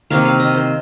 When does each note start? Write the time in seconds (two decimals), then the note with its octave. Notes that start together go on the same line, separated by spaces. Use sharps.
0.10 C3 D#3 A#3 F5
0.25 F5
0.39 D#5
0.54 C5